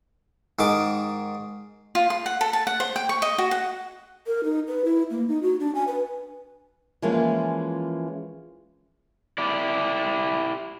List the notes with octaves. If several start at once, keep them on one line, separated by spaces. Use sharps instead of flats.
G#2 D#3 D6
F4
C6
F#5
A4
A5
F#5
C5
G5
C#6
D#5
F#4
F#5
A#4
D#4
B4
E4
A#3
D#4
F#4
D4
G#5
B4
E3 F3 G#3 A#3 C#4 F4
E4 G4 D5